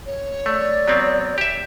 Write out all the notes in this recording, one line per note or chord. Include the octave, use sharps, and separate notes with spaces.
C#5
A3 D5
F#3 B3 C4
G4 E5